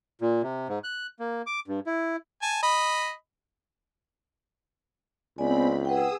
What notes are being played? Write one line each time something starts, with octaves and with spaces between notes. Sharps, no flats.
A#2
C3
G#2
F#6
A#3
D6
G2
E4
G#5 A5
D#5 B5
C#2 B3 C4 D5 G#5 B5
G#4 B4 F#5 G5 D#6 E6